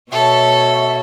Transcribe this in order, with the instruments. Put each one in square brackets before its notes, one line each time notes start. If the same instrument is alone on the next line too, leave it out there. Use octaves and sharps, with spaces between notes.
[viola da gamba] B2 F#4 C#5 [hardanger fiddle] A4 [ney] E5